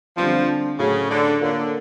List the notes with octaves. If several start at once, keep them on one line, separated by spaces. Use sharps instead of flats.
D3 F3 G3 C4
A2 C#3 F#3 A3
D3
D3 A#3 D4 F4 A#4 C#5